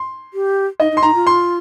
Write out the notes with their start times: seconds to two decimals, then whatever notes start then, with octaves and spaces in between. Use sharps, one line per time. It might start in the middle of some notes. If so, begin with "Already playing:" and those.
Already playing: C6
0.34 G4
0.80 D#4 D#5
0.92 D#4
0.97 C6
1.03 D#4 A#5
1.15 F4
1.27 C6